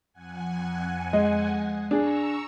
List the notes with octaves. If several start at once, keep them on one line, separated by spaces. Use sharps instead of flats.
F2 F#5 G#5
G#3 D#5
D4 G#4 A#5 C#6 E6